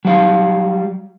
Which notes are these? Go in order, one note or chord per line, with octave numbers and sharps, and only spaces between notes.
F#3 G3 F5